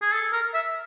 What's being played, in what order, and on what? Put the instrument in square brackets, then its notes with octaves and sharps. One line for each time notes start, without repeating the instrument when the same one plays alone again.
[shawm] G#4
A4
A#4
E5